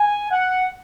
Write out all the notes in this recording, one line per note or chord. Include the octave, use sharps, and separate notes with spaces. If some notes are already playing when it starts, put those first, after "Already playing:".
Already playing: G#5
F#5